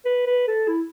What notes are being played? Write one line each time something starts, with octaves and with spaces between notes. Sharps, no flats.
B4
B4
A4
E4